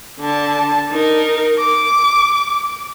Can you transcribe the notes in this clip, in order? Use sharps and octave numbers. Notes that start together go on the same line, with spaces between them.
D3 A5
D#4 A#4
D6